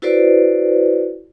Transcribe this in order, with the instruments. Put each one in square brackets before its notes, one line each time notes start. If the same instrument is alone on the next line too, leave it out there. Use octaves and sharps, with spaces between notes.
[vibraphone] E4 F#4 A4 B4 C5 D5